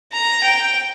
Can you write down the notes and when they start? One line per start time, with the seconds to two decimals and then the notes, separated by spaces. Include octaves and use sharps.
0.12 A#5
0.43 G5